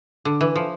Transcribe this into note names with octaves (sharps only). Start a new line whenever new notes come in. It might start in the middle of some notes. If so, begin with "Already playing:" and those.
D3
E3
F3